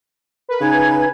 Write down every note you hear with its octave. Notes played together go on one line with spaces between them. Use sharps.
A#4 B4
C#3 D#4 G#5 G#6